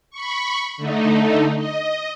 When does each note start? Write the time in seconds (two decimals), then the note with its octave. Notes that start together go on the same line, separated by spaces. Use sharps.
0.11 B5 C#6
0.77 D3 A3 D#4
1.57 D#5